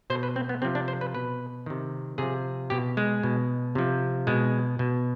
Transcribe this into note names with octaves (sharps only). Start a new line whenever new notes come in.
B2 C5
B4
C4
B3
C3 F3 C4
D4
C5
B4
B2 B4
C3 D#3
C3 F3 G#4
B2 G4
G#3
B2
C3 F3
B2 G#3
B2